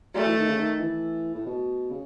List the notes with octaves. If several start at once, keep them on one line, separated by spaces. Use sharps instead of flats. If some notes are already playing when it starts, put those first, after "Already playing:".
F#3 A3
E3
D#3
C#3
D#3
E3
A2
B2
C#3